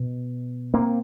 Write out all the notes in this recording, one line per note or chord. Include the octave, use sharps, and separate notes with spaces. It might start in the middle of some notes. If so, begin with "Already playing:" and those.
Already playing: B2
A#3 C4